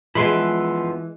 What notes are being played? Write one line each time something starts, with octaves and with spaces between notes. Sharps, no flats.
E3 F3 G#3 B3 B5 C6 C7